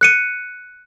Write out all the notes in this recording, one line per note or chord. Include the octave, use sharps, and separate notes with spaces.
F#6 C#7 D#7